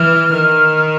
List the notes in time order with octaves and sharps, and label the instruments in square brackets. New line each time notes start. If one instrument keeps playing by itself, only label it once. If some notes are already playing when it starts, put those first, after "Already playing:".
Already playing: [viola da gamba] E3 [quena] F6
[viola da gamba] D#3